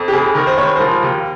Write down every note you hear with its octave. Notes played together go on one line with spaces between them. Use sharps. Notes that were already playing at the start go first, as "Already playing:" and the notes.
Already playing: F2
G4
F1 G#4
D#3 A#4
C5
F1 C#5
C5
F3 A#4
D#2